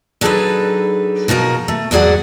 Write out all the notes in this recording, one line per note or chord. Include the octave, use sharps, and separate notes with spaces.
F#3 D4 D#4 G#4 A4 B4
B2 F3 F#4 A#4 G#5
A3
E2 G#2 F#3 G#4 D5 F#5